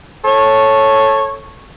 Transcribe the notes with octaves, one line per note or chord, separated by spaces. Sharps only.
A4 C#5